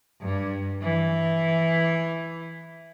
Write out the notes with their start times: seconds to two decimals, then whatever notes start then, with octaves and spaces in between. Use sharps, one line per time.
0.22 G2
0.82 E3